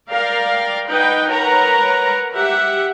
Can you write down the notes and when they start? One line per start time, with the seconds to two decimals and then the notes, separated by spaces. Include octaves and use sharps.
0.10 A#4 D5 F5 G5
0.88 D#4 B4 D#5 F#5 G5
1.30 A#4 B4 C#5 F#5 A#5
2.34 G4 E5 F#5